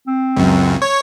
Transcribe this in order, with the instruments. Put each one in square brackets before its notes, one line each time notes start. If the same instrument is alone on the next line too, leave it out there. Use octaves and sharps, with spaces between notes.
[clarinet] C4
[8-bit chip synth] C#2 F#2
C#5